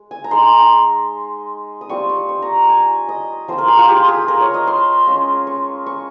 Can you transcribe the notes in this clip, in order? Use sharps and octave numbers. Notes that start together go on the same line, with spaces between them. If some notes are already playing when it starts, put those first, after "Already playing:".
Already playing: G#3
G#5
A#5
G#3 D#4 C6
D#6
G3 C4 F4 C#6
C#6
C#6
A#5
G#5
D#5
F3 C4 F4 C5
A#4
G#4
F4
G4
G#4
A#4
C#5
D#5
C6
G#3 C#4 F4
C#6
C#6